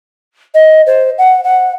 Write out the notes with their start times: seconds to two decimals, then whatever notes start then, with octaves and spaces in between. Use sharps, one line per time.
0.54 D#5
0.86 C5
1.18 F#5
1.43 F#5